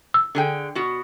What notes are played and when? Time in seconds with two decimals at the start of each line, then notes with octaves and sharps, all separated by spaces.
0.14 E6
0.35 D3 G#4 G5
0.75 B2 F#4